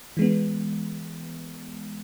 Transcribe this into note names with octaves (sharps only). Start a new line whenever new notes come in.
E3 G#3 B3